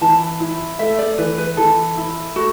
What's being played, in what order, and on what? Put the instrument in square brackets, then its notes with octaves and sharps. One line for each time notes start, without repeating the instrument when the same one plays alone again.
[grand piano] E3 [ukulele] A5
[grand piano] E4
[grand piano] A3 [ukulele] E5
[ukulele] D5
[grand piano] E3 [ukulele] B4
[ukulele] B4
[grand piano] E3 [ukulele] A4
[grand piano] E4
[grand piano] A3 [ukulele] F#4